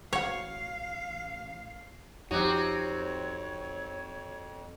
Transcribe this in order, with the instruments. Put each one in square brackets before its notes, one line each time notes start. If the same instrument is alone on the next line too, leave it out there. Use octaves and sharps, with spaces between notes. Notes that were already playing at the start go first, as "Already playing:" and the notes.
[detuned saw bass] A1 [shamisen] F#4 F#5 [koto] C#5 [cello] F5
[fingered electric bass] F2 [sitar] C4 F#4 [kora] D#4 G4 [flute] C#5